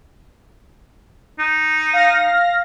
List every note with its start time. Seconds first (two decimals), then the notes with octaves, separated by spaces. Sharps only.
1.39 D#4
1.93 F5 A#6